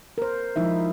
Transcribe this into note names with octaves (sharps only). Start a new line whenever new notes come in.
A#4 C5
F3 G#3 D#4 E4 E5